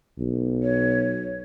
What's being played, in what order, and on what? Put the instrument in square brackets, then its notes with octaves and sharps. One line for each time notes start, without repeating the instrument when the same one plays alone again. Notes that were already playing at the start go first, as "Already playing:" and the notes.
[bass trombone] B1
[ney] C#5